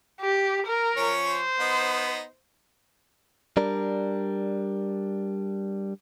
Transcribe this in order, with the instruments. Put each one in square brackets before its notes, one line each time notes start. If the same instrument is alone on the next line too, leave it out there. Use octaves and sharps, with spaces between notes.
[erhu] G4
A#4
[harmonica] F3 C#4 C#5
[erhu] C5
[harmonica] B3 D#4
[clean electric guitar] G3 D4 A#4